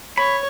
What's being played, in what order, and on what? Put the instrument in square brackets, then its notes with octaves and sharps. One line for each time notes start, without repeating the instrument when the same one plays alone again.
[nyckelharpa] C#5 [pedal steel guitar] B5